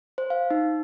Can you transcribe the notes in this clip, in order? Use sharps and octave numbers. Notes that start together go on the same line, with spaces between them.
C5
F5
D#4